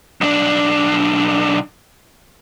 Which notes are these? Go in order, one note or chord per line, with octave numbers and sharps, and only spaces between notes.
B1 D4